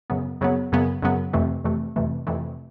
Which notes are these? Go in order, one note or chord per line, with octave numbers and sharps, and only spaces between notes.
F#2 C#3 F#3 B3
F#2 C#3 F#3 B3
F#2 C#3 F#3 B3
F#2 C#3 F#3 B3
F2 C3 E3 A3
F2 C3 E3 A3
F2 C3 E3 A3
F2 C3 E3 A3